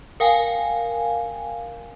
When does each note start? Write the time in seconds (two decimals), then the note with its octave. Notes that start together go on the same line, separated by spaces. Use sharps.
0.20 A#4 F5 G5 G#5